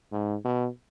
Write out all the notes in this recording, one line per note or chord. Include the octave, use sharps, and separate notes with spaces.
G#2
B2